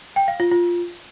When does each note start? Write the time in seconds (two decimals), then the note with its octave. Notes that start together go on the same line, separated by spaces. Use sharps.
0.16 G5
0.28 F5
0.40 F4
0.51 F4